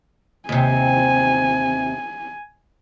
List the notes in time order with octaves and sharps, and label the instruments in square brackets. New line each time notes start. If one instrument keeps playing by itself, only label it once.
[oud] D#2 C3 [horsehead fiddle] G#5